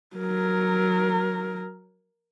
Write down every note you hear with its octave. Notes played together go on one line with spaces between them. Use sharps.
F#3 A#4